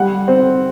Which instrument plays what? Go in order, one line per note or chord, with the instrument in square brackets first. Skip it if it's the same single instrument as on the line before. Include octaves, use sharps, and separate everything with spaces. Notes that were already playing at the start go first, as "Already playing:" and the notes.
Already playing: [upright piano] G3 F#5
C4